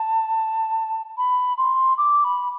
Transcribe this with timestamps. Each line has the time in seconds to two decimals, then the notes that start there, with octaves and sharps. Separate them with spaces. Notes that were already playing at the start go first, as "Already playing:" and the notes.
Already playing: A5
1.17 B5
1.57 C6
1.97 D6
2.24 B5